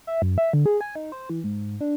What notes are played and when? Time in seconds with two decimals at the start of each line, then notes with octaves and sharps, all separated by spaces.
0.07 E5
0.22 F#2
0.38 E5
0.53 D3
0.66 G#4
0.81 G#5
0.96 D#4
1.12 C5
1.29 E3
1.44 G#2
1.81 D4